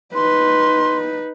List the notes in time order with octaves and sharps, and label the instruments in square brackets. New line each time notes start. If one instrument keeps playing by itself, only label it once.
[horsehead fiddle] D#4 B4 [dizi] C6